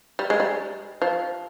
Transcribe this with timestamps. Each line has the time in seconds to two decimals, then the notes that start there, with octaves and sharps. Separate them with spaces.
0.19 G3
0.30 G#3
0.40 G3
1.02 F3